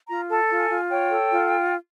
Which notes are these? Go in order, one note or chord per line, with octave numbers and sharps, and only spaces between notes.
F4 A#5
A4 A5
F4
G#5
F4
C#5 G5
A4
F4